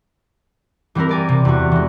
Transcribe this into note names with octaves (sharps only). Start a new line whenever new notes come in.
E3 G3 C4 E4 A#4
A#4 D5 G#5
C3
E2 F#4
E3 G#3